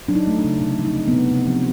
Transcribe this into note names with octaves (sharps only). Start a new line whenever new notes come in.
F#3 D4
D#4
A3
D4
C#3
C3 D#4
F3
D#4
G#3
B3
C3
C3
F3